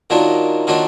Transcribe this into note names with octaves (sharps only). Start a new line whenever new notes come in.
D#3 F#3 A#3 D4 F4
D#3 F#3 A#3 D4 F4